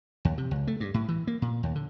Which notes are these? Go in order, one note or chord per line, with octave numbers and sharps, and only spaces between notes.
D#2
C3
C#2
A3
G2
A2
E3
A#3
A#2
D#2
D3